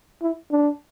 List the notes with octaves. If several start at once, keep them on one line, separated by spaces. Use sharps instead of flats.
E4
D4